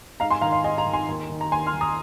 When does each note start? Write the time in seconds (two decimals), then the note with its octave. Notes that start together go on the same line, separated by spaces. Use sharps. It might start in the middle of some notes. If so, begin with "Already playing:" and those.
0.20 G#2 F5 A#5
0.30 G#5 C6
0.41 D#3 F5 A#5
0.52 F5
0.64 G#2 D#5 G#5
0.78 F5 A#5
0.86 D#3
0.93 G#5 C6
1.09 D#2
1.29 D#3
1.41 A#5
1.52 D#2 G#5 C6
1.67 C6 F6
1.73 D#3
1.81 A#5 D#6